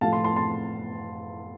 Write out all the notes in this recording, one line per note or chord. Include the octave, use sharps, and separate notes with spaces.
A2 F3 A3 F5 A5
A5 C6
A5 C6
A5 C6